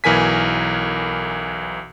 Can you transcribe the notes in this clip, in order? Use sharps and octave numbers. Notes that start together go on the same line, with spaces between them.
B1 E3 A#4 G#5 B6